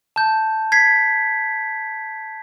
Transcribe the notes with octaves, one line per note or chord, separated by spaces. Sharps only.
A5 G6
G#6 B6 C7